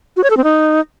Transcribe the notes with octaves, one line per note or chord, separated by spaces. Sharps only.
F#4
C#5
A4
C4
D#4